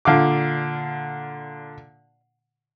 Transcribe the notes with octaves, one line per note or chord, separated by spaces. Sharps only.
A#2 D3 F5 D6